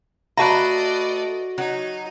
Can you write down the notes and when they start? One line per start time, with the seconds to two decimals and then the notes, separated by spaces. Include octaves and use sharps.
0.38 A3 F#4 B4 D5 D#5 A5 A#5 A#6
1.58 F#3 D#4